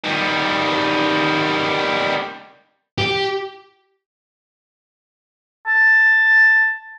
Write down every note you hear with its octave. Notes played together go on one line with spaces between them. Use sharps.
D#3 G3
G4
A5